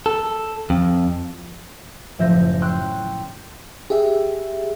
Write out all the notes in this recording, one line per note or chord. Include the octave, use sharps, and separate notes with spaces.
A4
F2
F#1 A2 F3 E5 G6 A#6
G5 C6 C#6 E6 F#6 G6
G4 G#4 E5